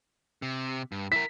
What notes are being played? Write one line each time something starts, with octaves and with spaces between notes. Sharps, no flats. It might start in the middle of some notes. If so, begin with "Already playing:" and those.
C3
G2
E4 A#4 B6